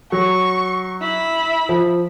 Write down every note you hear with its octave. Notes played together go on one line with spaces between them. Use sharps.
F#3 C#6
E4 B5
F3